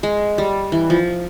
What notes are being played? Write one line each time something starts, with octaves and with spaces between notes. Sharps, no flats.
G#3
G3
E3
F3